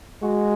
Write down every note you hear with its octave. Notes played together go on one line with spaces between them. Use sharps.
G#3 F#4